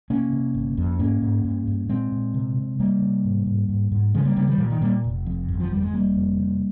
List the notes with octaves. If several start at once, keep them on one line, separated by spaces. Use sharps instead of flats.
C3 A#3 C#4
C3
G1
F2
G#2 A#3 C#4
G#2
G2
G2
A#2 G#3 C4
A#2
C3
C3
C3 G3 A#3
C3
G#2
G#2
G#2
G#2
C#3 F3 G#3
G3 A#3
C#3 G3 A#3
D#3 G3
A#2 F3
D#3
A#2 G3 A#3
F1
F2
G1
F3
F2 G3
G#3
F1 G3 A#3
F2
C3